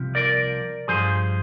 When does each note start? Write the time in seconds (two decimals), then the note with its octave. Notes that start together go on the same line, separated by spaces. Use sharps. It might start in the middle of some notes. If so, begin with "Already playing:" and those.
Already playing: C2 C3 F3
0.15 A#4 D5
0.88 G2 F3 G#4 C5